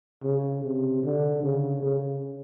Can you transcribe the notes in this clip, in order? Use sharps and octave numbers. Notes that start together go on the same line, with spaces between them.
C#3
C3
D3
C#3
C#3